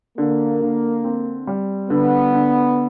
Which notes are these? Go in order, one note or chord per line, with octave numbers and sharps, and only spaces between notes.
D3 A#3
D3
C4
G3
D3 B3
D3